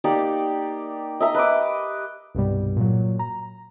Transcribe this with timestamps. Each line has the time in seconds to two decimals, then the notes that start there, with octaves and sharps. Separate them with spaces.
0.04 A#3 D#4 G4 D5
1.20 D#5 E5 A#5
1.34 B4 D#5 D6
2.35 C2 G2 B2 G3
2.76 A#2 F#3
3.19 A#5